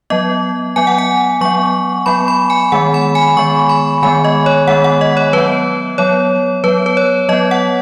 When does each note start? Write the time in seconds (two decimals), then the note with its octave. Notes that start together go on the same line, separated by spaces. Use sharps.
0.10 F#3 B3 D#5
0.76 F#3 B3 G#5
0.87 F#5
0.98 G#5
1.41 F#3 B3 C#6
2.06 F#3 B3 B5
2.28 B5
2.50 G#5
2.72 D#3 G#3 B3 F#5
2.94 B5
3.15 G#5
3.37 D#3 G#3 B3 C#6
3.69 B5
4.02 D#3 G#3 B3 G#5
4.24 D#5
4.46 C#5
4.67 D#3 G#3 B3 F#5
4.84 F#5
5.01 D#5
5.17 C#5
5.33 F#3 B3 B4
5.98 F#3 B3 C#5
6.64 F#3 B3 B4
6.86 B4
6.97 C#5
7.29 F#3 D#5
7.33 B3
7.51 F#5